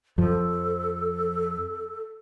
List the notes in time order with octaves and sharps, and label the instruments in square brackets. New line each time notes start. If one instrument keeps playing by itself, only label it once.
[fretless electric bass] F2 F3 [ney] A4